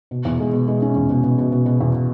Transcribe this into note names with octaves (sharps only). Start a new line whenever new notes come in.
B2
E2
G#3
B2
G#3
C#4
E2
B2
B2
B2
B2
B2
E2